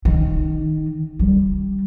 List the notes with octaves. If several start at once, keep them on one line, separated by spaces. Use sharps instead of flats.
D#3
G3